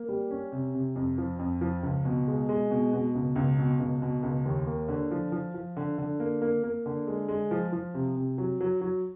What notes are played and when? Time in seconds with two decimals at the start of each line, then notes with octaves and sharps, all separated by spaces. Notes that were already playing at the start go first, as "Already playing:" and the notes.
Already playing: A#3
0.09 G3
0.31 C#4
0.52 C3
0.74 C3
0.96 F2
1.18 F3
1.39 F2
1.61 F3
1.83 C#2
2.05 B2
2.28 G#3
2.49 G#3
2.71 B2
2.93 B2
3.15 C#2
3.36 C#2
3.59 B2
3.80 C#2
4.02 B2
4.23 C#2
4.46 D#2
4.67 A#3
4.88 D3
5.11 F3
5.32 F3
5.54 F3
5.77 D3
5.98 D3
6.20 A#3
6.42 A#3
6.64 A#3
6.86 D3
7.07 G#3
7.28 G#3
7.51 F3
7.72 F3
7.94 C3
8.16 C3
8.38 F#3
8.61 F#3
8.81 F#3